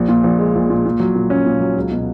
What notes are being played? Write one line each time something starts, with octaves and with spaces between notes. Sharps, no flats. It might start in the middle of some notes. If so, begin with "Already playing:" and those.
Already playing: A#1
A#2
A#1
G#3
A#1
A#2
A#2
F#3
A#2
C#4
A#2
F#3
C#2
B2